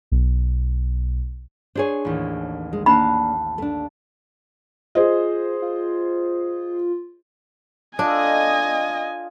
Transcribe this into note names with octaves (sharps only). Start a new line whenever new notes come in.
B1
D4 G#4 C5 C#5 G#5
A1 D#2
G#3
A#3 D4 F5 F#5 A5 B5
A3 D4
F4 G#4 C5 D#5
F4
D4 F4 A4 D#5 G#5